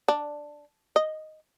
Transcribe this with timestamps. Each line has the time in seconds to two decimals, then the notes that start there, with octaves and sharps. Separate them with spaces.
0.08 D4
0.96 D#5